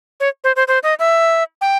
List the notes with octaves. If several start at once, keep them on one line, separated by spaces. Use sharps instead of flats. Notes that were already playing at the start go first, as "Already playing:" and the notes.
C#5
C5
C5
C5
D#5
E5
G5